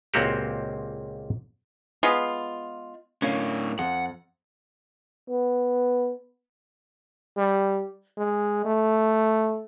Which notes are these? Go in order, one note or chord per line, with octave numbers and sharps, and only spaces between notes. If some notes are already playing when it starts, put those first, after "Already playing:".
C#2 A#2 A#3 C4 F#4 G4
G#3 B3 F4
A2 D3 A#3 C#4
F2 F#5
B3
G3
G#3
A3